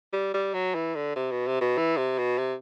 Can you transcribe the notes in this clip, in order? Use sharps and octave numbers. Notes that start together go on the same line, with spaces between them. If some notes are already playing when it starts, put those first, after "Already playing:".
G3
G3
F#3
E3
D3
C3
B2
C3
B2
E3
C3
B2
C3